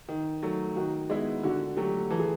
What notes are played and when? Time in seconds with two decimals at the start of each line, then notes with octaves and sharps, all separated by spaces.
0.09 D#3
0.43 F#3 A3
0.76 D#3 F#4
1.10 G#3 B3 E4
1.43 D3 F#4
1.76 F#3 A3 G4
2.10 E3 A4
2.19 G#4